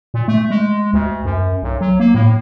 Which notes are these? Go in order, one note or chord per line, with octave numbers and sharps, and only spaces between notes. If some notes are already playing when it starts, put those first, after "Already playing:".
A#2
A3
G#3
D2
F#2
B1
F#3
A#3
A2